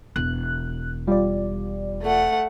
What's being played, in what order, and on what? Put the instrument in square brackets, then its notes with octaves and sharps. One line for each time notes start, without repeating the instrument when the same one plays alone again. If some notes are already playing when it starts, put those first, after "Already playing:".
[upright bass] E1 [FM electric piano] F#6
[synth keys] G3 [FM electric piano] F4 D5
[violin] A3 F#5